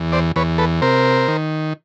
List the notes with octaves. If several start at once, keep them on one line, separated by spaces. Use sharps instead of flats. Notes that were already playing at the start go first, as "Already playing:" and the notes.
Already playing: E2
C5 D5
E2 B4 C#5
A4 B4
C3 A#4 C5
D#3